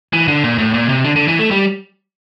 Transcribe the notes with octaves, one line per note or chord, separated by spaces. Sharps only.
E3
D3
A#2
A2
A#2
C3
D3
D3
E3
A3
G3